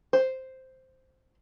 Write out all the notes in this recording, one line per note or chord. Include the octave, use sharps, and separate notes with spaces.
C5